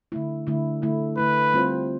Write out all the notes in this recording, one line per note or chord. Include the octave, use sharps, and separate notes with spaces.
D3 A3 E4
D3 A3 E4
D3 A3 E4
D3 A3 E4 B4
G3 C4 F4 C5